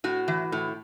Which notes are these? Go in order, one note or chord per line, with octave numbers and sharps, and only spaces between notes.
A2 F#4
E3
A2